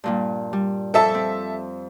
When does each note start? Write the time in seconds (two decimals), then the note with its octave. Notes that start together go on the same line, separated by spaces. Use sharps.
0.04 G2 A#2 G3
0.53 G3
0.94 F2 A4 E5 A5 E6
1.15 C4